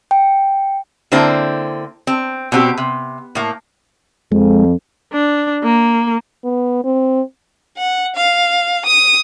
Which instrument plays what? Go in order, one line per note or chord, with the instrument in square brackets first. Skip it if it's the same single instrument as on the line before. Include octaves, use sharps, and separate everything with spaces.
[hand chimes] G5
[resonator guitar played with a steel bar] D3 A#3 C4 E4 C5
C4
B2 C4 G4
C3
A2 A#3
[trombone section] F2 [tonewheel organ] G#3
[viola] D4
A#3
[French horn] B3
C4
[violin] F#5
F5
D#6